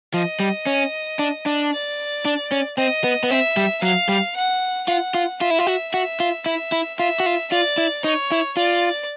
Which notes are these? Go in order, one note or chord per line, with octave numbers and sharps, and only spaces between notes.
F3 D#5
G3
C#4
D4
D4
D5
D4
C#4
C4 D#5
B3
B3
C4 E5
G3
F#3 F5
G3
F#5
F4 F#5
F4
F4 E5
E4
F4
F#4
F#4 E5
F4
E4 E5
E4
F4 E5
F#4
F4
F4 D5
E4
D#4 C#5
E4
F4 D5